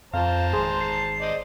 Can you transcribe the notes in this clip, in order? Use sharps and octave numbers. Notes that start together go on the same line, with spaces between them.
F2 C5 F5 A5 A#5
G#1 G#4 C6
C7
C5 D5 D#5